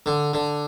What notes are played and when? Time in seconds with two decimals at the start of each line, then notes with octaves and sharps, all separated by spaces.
0.06 D3
0.34 D3